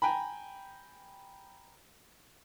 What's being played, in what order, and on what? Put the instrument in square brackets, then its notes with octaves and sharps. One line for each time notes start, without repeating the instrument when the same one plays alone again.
[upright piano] G5 G#5 A#5 B5